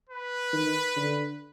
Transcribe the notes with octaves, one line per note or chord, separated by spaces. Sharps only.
B4
D#3
D3